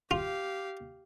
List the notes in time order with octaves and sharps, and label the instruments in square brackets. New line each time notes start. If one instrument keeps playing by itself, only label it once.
[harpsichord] F4 [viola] G4 F5